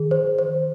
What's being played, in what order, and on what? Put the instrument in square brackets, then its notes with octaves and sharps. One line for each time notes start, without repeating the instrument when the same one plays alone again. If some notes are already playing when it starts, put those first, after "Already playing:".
Already playing: [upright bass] D#3 [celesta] G#4
[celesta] C5
C5